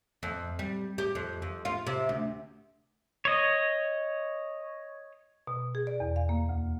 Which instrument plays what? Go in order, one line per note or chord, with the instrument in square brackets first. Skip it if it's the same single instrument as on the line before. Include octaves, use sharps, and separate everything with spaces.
[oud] F2
G3
G4
F2
F2
F4
C3
D2
[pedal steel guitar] C#5 D#5
[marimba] B2
G#4
D5
E2
F5
A#3
D2